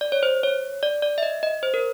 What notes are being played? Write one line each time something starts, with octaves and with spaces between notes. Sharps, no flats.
D5
C#5
C5
C#5
D5
D5
E5
D#5
D#5
C5
A#4